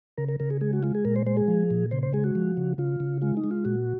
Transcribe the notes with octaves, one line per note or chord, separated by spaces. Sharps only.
C#3 A#4
A#4
C#3 A#4
G#4
G#3 G#4
F#4
G#3 F4
G#4
A#2 A#4
C5
G#3 C5
G#4
F3
A#2
C#3 C5
C5
G#3 G#4
F#4
F3
C#3
C#3 F4
C#3
G#3 F4
D#4
G#3
F4
A#2 F#4